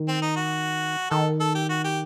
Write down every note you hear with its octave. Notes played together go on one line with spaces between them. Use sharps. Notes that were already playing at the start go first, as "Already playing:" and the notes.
Already playing: D#3
C4
D#4
F#4
D#3 A4
A4
G4
F#4
G4